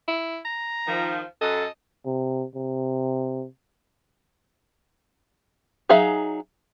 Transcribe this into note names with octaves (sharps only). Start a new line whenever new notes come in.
E4
A#5
D#3 F3
F#2 A4 D#5
C3
C3
F#3 D#4 G#4 E5 F5